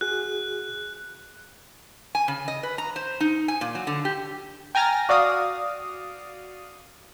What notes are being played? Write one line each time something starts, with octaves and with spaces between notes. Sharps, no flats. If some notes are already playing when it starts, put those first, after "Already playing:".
F#4 G#4 F#6
G#5
C#3
D#5
B4
A#5
C5
D#4
G#5
A#2
F#3
D3
G4
G5 G#5 A#5 F6 A6 A#6
F#4 D5 F5 D#6